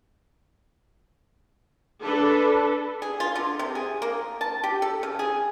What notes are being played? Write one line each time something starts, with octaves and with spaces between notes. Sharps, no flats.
D4 A4 B4
G#4
F4
D3
C3
G#4
A#3
A5
G4
A4
C#3
G#4